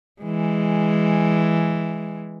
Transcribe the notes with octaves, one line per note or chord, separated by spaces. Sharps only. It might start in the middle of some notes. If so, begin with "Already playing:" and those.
E3 G#3